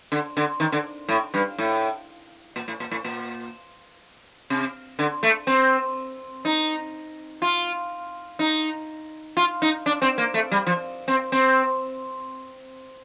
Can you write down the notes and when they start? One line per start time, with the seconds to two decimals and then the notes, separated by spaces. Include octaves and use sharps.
0.12 D3
0.37 D3
0.60 D#3
0.72 D3
1.09 A2
1.34 G2
1.58 A2
2.56 A#2
2.68 A2
2.80 A#2
2.91 A2
3.04 A#2
4.50 C3
4.99 D3
5.23 A3
5.47 C4
6.45 D#4
7.42 F4
8.39 D#4
9.37 F4
9.62 D#4
9.86 D4
10.02 C4
10.18 A#3
10.34 A3
10.51 G3
10.67 F3
11.08 C4
11.32 C4